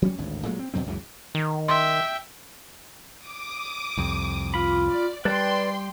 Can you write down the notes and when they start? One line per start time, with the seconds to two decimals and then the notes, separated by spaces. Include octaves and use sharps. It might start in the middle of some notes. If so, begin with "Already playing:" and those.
0.02 F#3 G3 C#4
0.18 G#1 D2 A2
0.45 A#2 F#3 G#3 A3
0.59 C4
0.74 E2 B2 F#3 C4
0.86 C#2 F#2 C#3 E3
1.35 D#3
1.68 E5 G5 C6
3.26 D6 D#6
3.98 C2 F2
4.54 F4 B5
4.89 D5
5.25 G3 B4 D5 G5 A5 C6